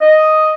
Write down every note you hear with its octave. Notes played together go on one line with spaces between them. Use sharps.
D#5